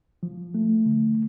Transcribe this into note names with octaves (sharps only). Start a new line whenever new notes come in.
F3
A3
D3